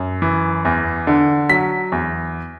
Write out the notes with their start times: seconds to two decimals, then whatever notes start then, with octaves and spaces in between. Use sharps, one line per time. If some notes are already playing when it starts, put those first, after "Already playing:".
Already playing: F#2
0.22 E3
0.65 E2
1.07 D3
1.49 F#3 B6
1.92 E2